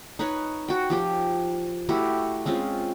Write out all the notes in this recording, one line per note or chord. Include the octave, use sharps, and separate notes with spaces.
D#4 B4 C#5 G#5
F#4 G5
F3 G4 G5
A3 E4 F#4 G4
G#3 C4 C#4 F4